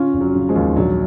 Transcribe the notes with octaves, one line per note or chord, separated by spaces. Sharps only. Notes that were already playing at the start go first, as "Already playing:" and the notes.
Already playing: C#3 C#4 F4
F1
F#3
C#3
F3 G#3
D#2
A#1 F#3